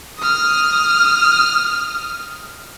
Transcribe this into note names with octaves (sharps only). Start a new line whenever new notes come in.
D#6 F6